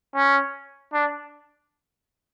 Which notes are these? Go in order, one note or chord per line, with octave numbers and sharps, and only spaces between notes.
C#4
D4